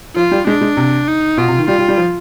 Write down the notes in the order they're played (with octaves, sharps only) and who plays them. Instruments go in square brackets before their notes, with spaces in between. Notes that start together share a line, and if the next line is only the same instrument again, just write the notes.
[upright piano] F3 [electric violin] F4
[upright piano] G3
[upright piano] G#3 [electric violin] D4
[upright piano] G#3
C3
[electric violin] D#4
[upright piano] B2 [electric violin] F4
[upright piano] C3
D#3
[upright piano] G3 [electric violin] F4
[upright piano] G3
G3
F3